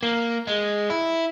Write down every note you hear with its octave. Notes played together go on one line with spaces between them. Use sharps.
A#3
G#3
E4